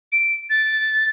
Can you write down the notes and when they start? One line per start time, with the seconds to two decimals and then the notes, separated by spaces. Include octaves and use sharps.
0.12 D7
0.50 A6